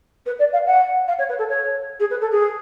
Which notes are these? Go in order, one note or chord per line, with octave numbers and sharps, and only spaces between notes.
B4
D5
F5
F#5
F5
C#5
B4
A4
C#5
G#4
B4
A4
G#4